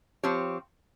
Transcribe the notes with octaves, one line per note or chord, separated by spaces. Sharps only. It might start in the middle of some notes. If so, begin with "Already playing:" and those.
F3 C4 G4 C#5